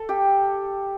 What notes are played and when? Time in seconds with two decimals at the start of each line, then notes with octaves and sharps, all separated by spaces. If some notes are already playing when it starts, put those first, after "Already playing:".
Already playing: A4 A5
0.09 G4 G5